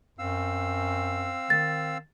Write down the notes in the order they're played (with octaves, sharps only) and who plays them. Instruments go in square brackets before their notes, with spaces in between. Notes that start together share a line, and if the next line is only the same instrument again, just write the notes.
[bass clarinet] F#2 [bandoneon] C4 F5 E6
[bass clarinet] D#3 [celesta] A6